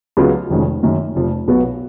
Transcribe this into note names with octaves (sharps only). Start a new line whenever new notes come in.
C#2 C#3 F#3 B3 F4
F1 F2 D#3 G#3 C#4
F#2 D#3 A#3
F1 F2 F3
B1 B2 F#3 B3 F#4